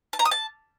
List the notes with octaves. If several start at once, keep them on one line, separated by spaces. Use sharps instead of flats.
A5
A#5
D#6
A5